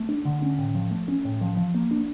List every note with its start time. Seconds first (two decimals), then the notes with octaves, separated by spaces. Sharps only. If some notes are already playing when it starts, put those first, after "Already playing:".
Already playing: A3
0.09 D4
0.25 D3
0.42 C#4
0.58 A2
0.75 F3
0.91 A3
1.08 C#4
1.25 A2
1.41 F3
1.57 F3
1.74 A#3
1.91 D4